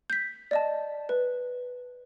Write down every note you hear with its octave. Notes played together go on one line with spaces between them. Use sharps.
G6 B6
D5 D#5 A5
B4